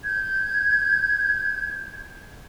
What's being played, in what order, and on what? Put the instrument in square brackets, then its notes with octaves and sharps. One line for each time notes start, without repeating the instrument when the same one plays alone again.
[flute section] G6 G#6